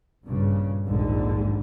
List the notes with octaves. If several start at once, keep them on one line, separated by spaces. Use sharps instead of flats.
A#1 G2 C#3
A#1 D#2 G#2 D3